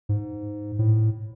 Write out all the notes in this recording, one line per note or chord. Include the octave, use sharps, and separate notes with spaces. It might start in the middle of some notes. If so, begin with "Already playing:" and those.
G#2
A2